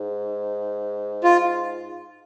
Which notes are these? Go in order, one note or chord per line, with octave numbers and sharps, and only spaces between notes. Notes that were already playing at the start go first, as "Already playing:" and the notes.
Already playing: G#2
F4